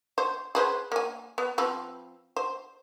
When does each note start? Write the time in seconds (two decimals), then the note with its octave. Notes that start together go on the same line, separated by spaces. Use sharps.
0.18 C5
0.55 G#4 B4 C5
0.92 A#3 G#5
1.38 B3
1.58 F3 C4 B4
2.36 C5